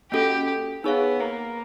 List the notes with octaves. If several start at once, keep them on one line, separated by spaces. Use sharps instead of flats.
A#3 C#4 F#4 G4 A4
B3 D#4 G#4 C#5 F5
A#3